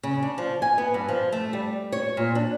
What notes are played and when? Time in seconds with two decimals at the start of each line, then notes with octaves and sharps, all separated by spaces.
0.03 C#3
0.23 D4
0.38 F3
0.62 G#5
0.78 B3
0.94 G2
1.09 F3
1.32 A3
1.53 G3
1.92 C#5
2.17 A#2
2.35 D4